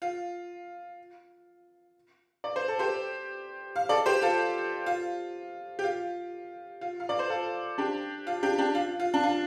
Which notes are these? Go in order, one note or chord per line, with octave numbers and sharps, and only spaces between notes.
F4
D5
C5
A4
G4 C5
F5
A4 D5
G4 C5
F4 A4
F4
G4
F4
F4
F5
D5
C5
F4 A4
D4 G4
F4
D4 G4
D4 G4
F4
F4
D4
F4